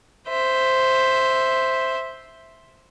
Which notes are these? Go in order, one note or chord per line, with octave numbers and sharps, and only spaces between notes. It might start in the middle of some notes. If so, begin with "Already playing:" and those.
C5 E5